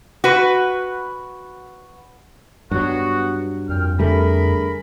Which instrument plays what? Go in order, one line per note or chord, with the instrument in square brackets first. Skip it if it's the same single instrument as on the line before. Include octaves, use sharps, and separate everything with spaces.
[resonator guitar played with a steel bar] F#4 B4
[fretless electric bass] G2 F#3 [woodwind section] B3 F#4
[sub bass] F2 [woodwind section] A#2 G5 F6
[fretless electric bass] D3 G3 A3 [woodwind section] G#4 A#4 B5